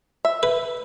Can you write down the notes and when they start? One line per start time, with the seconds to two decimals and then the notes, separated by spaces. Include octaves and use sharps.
0.25 E5
0.43 B4